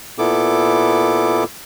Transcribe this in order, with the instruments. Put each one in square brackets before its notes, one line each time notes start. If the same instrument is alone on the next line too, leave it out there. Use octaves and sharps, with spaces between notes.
[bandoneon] A#2 B3 E4 A4 D6